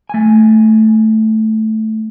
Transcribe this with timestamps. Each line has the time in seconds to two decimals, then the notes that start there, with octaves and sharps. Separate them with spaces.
0.09 A3 G#5